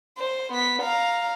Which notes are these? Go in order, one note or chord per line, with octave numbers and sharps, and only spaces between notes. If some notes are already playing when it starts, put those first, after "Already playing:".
C5
B3 B6
F5 A#5